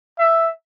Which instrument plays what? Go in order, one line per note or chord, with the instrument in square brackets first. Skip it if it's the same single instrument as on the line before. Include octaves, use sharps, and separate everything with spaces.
[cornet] E5